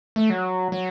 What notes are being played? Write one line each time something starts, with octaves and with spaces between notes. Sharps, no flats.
A3
F#3
F#3